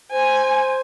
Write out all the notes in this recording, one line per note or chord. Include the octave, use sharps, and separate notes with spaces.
C5 G#5